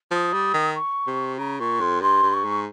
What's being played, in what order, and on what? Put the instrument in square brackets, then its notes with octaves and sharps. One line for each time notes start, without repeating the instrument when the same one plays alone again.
[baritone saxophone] F3 [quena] D#6
[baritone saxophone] G3
D#3
[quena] C#6
[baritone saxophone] C3
[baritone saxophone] C#3 [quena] A#5
[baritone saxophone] A#2 [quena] C#6
[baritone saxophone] F2 [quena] C6
[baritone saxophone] G2 [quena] C6
[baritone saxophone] G2
[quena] C#6
[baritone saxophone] G#2